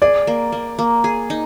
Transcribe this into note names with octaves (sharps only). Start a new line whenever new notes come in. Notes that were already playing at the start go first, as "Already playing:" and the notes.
G#4 D5
A#3
A#3
A#3
G#4
D#4